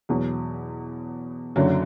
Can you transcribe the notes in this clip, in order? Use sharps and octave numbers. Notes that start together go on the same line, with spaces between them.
E2 B2 F#3
F#1 F#2 D3 F#3